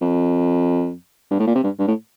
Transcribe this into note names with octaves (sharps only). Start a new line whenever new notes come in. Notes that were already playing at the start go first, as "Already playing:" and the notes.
F2
G2
A2
A#2
C3
G2
G2
A2